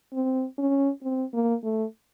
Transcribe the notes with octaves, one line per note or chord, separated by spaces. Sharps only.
C4
C#4
C4
A#3
A3